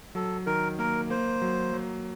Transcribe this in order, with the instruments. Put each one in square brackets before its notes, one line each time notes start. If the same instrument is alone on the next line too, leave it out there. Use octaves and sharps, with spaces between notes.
[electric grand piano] F#3 [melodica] A4
[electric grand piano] D#3 [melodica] A#4
[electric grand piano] A#3 [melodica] A#4
[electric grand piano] A#3 [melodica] C5
[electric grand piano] F#3
F#3